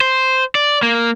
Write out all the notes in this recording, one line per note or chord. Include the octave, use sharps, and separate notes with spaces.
C5
D5
A#3